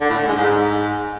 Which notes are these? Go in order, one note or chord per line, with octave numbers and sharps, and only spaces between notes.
D3
A2
D3
G#3
G#2